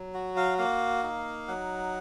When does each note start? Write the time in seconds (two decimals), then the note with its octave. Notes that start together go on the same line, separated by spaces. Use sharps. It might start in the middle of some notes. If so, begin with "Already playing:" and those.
Already playing: F#3
0.14 F#4
0.37 F5
0.58 A#3 F5
1.03 D#4
1.48 F#3 F#5